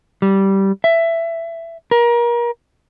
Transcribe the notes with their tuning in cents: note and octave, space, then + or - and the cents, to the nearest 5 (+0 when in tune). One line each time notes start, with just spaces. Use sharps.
G3 -10
E5 +15
A#4 +30